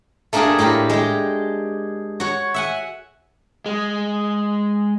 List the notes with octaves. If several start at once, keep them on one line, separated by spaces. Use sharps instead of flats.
A3 A#3 D4 G4 G#4
A2 G4 F5 A#5
G#3 G4
F#4 C#5
E5 F#5 G#5
G#3